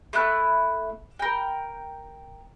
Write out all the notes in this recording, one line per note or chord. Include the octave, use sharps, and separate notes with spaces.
A3 E4 F#6
A#4 G5